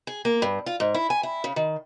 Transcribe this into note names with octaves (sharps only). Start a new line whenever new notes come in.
G#4
A#3
G2
F4
G#2
E4
G#5
E4
C#3
D#3